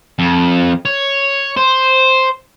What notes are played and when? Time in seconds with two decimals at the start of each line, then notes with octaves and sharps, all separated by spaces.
0.19 F2
0.85 C#5
1.57 C5